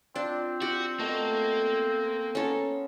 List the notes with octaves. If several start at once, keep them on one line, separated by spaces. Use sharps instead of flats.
C4 D4 F4
F#4 G4
B2 A3 A#3
B3 C#4 A4 A#4 C5